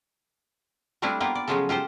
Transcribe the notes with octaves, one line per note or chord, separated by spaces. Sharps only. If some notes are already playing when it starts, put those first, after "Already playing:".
G3 A3 C4 D4 E4 F4
A#3 B3 F4 G4
D5
C#3 F3 F#3 G#3 F4 A4
F4 G4 A4 C5